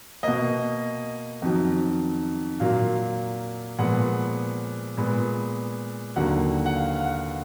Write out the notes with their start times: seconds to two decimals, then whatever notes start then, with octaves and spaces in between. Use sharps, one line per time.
0.23 B2 A#3 D#5
1.42 F2 D#3 F#3
2.60 A#2 F#3 A#3 F5
3.79 A#2 F3 G#3 B3 F#5
4.97 A#2 G#3 B3
6.16 D#2 D3 F#3 A#3 F#5
6.66 F#5
6.75 F5
6.96 F5
7.05 F#5